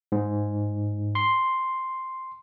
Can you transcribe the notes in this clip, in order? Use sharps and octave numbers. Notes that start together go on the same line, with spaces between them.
G#2
C6